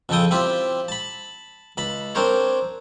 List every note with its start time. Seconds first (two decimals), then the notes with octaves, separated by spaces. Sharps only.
0.09 F2 C#3 F3 A4 G5 D#6
0.31 C4 E4 F4 G4
0.88 A5 B5
1.77 C#2 A5 B5
2.15 C4 D4 A#4 C5 C#5